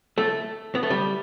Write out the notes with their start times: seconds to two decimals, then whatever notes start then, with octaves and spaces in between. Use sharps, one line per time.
0.18 A3
0.75 B3
0.83 A3
0.90 G3